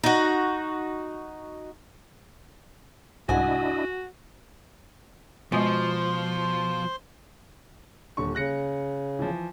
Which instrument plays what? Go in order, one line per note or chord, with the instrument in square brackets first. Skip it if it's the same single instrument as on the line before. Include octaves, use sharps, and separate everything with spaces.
[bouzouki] D#4 F#4
[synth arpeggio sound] C2 G#2 [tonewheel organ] D4 E4 D#5 [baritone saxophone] F#4 [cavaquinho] F#5 G#5
[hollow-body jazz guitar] B2 [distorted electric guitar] F3 [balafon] G#3 F#4 G#5 [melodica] C5 C6
[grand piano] D#1 D3 C#6
[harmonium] C#3 [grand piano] F#6 A#6 C#7
[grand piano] E3 F3